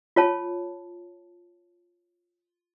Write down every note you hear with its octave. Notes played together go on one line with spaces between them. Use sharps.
F4 C#5 A5